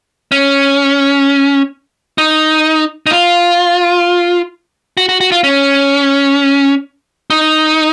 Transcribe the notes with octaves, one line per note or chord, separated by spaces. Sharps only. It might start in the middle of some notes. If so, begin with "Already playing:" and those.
C#4
D#4
D#4
F4
F#4
F#4
F#4
F4
C#4
D#4